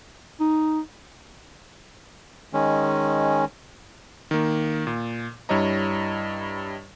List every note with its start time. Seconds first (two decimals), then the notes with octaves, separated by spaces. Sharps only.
0.40 D#4
2.53 D#3 G#3 C#4
4.31 D#3 A#3
4.87 A#2
5.49 G2 G3 E4 C#5 D#5 A#5